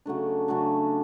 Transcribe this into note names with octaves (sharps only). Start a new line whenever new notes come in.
C#3 F#3 A3 D4
C#3 F#3 A3 D4